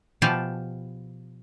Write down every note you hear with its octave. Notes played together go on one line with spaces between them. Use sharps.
B2 F3 F4 G4 G#5 A5